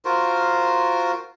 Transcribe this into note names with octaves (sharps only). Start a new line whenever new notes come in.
F4 F#4 A#4 C5